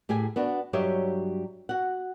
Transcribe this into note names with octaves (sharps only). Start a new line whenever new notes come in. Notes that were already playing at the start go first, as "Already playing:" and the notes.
A2 G4 G#4 G#5
B3 D4 F#4
G2 F#3 G4 C#5 D#5 E5
F#4 F#5